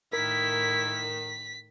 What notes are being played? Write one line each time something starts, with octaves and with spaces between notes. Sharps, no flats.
A2 D#3 E4 A#4 B6